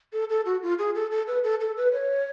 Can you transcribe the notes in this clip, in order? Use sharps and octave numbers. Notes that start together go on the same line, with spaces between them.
A4
A4
F#4
F4
G#4
A4
A4
B4
A4
A4
B4
C#5